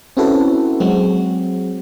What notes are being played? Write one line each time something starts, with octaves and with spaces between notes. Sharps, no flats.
C4 C#4 E4 F#4 A4 B4
F#3 G#3 C4 F#4